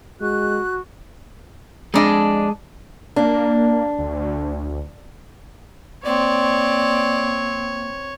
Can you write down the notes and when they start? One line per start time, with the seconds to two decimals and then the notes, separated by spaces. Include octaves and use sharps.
0.21 G#3 F#4 F#6
1.94 F2 G#3 D4 G#4 D#5
3.16 A#3 D4
3.99 D2
6.06 A#3 C4 C#5 D5